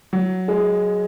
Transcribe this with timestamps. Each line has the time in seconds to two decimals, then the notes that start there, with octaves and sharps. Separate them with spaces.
0.13 F#3
0.48 G#3